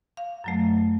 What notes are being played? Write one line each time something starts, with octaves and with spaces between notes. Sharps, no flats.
F5
F#2 F#3 A3